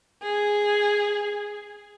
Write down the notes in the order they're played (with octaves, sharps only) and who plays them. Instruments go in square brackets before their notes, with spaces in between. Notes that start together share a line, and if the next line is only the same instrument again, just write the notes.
[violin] G#4